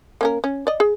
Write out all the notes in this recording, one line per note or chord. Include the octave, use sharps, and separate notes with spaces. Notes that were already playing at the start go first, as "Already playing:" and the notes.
A#3 C#4 A#4
C#4
D5 D#5
G#4